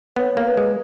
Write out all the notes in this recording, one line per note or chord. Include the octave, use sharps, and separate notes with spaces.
B3 C#5
A#3
B4
G#3